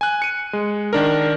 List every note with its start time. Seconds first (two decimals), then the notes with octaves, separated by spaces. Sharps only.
0.01 G#5 F#6
0.22 C#7 D#7
0.53 G#3
0.93 D#3 D4 A#4